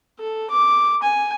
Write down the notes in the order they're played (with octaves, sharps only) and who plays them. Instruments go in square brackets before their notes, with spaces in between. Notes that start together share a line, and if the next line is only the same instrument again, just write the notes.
[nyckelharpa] A4
D6
G#5